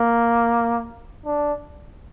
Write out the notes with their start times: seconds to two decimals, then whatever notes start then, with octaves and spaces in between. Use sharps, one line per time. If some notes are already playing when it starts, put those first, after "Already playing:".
Already playing: A#3
1.26 D4